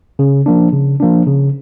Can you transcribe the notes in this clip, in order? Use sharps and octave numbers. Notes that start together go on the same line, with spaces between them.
C#3
F3 A#3 D4
C#3
F3 A#3 D4
C#3